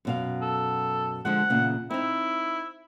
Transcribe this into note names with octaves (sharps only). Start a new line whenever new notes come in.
F#2 B2 F5
A4
D3 F3 G#3 F#5
E2 A#2 C#3
C4 D#4 E4